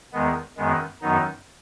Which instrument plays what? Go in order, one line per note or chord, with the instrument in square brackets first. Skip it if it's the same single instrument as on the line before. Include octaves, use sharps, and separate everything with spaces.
[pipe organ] E2 D#3 G#3 B3
F#2 D#3 G#3 B3
F#2 D#3 F#3 B3 D#4